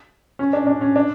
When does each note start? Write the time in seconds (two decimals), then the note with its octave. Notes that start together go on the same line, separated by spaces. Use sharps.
0.39 C#4
0.53 D4
0.67 D4
0.81 C#4
0.96 D4